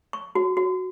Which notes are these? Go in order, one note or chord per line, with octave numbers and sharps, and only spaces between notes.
C#6
F#4
F#4